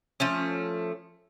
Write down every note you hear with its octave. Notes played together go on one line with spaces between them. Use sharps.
F3 A3 C#4